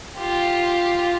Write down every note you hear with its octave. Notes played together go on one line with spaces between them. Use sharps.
F4 G4